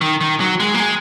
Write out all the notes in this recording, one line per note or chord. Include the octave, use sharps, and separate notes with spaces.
D#3
D#3
F#3
G#3
A#3
G#3